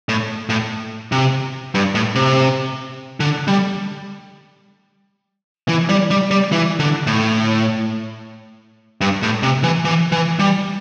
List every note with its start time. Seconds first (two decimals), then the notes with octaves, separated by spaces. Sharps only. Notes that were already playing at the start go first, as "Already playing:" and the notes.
0.09 A2
0.49 A2
1.12 C3
1.74 G2
1.95 A2
2.15 C3
3.20 D3
3.48 G3
5.68 E3
5.89 G3
6.11 G3
6.31 G3
6.52 E3
6.80 D3
7.07 A2
9.01 G2
9.23 A2
9.43 C3
9.64 E3
9.85 E3
10.12 E3
10.39 G3